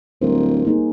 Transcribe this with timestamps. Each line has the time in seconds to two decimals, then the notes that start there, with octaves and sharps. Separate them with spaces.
0.22 D1 G3 A#4 C5
0.65 A#3 D#4 G#4